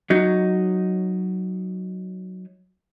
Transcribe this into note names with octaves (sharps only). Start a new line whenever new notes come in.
F#3 D#4